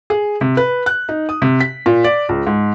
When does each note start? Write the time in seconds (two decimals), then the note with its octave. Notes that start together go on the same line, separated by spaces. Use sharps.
0.10 G#4
0.41 C3
0.57 B4
0.86 F#6
1.09 D#4
1.29 D#6
1.42 C3
1.60 B6
1.86 A#2
2.04 D5
2.29 C#2
2.47 G#2